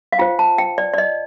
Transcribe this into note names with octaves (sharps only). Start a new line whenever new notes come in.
F5
F4 C5 G5
A5
G5
D5
D5
D#5